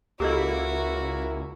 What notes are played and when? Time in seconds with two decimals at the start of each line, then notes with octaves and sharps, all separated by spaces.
0.20 C#2 A#3 E4 F#4 G4 A4 D#5